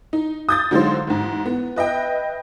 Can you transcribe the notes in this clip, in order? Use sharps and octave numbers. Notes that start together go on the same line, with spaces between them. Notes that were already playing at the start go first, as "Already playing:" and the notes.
D#4
D#6 G6 A6
D3 F#3 G#3 D#4 F4 C5
A1 G#2
B3
B4 D#5 E5 G5